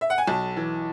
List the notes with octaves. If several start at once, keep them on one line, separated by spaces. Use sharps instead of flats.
E5
F#5
G#5
B1 A5
E3